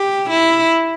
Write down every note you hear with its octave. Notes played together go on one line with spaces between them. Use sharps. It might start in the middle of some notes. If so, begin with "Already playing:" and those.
Already playing: G4
E4